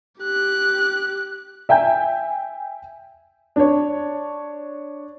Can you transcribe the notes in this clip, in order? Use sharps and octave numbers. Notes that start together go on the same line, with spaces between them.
G4 F#6
E5 G5 G#5 G6
D4 C#5